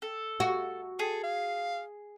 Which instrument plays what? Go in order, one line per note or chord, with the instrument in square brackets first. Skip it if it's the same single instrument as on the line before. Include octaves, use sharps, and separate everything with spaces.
[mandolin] A4
[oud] F#4
[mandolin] G#4 [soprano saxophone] A4
[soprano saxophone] F5